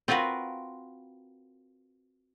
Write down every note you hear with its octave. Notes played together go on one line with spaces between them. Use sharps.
C4 F4 F#4 A#4 B4